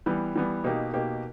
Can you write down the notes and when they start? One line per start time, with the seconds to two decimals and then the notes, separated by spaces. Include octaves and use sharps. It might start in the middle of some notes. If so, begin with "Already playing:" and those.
0.06 E3 G3 B3
0.36 E3 G3 B3
0.64 B2 A#3 D#4 G4
0.94 B2 A#3 D#4 G4